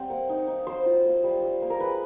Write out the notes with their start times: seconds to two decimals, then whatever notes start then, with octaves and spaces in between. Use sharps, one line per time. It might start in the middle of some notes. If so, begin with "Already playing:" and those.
Already playing: G3 C4 F#5
0.10 A#3
0.29 D#4
0.47 D#4
0.67 F#3 C5
0.86 F4
1.05 A#3
1.24 G3
1.42 G3
1.62 A#3
1.70 A#4
1.80 G#3 B4